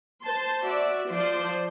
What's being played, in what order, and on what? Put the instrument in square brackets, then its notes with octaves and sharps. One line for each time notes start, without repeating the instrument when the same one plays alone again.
[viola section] C5 A5 C6
F#4 D5 E5
F3 C5 D5